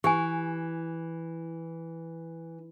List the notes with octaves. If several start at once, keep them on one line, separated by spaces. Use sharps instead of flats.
E3 G4 G#5